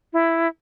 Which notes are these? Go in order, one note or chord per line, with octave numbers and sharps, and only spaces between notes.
E4